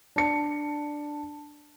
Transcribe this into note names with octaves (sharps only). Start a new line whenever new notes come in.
D4 C#7